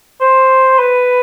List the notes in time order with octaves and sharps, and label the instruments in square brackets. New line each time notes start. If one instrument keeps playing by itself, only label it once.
[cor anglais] C5
B4